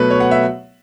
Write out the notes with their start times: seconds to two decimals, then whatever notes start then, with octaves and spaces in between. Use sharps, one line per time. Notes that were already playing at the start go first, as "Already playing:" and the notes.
Already playing: B2 F#3 A3 B4 C#5
0.10 C#5
0.20 F#5
0.31 E5